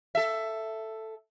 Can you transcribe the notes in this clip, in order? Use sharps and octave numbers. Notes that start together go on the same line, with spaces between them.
A4 E5